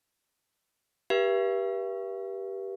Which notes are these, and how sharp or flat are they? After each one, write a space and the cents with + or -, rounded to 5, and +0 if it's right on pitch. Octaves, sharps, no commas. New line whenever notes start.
G4 +0 B4 -40 E5 +40